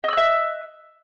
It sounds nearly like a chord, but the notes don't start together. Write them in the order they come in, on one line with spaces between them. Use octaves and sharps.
D#5 E6 F#6 E5